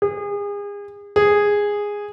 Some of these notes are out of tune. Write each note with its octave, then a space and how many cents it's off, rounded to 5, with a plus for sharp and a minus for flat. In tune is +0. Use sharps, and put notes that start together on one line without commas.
G#4 -35
G#4 -10